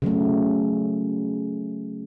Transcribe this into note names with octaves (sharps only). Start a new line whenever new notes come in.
C#3 F#3 A3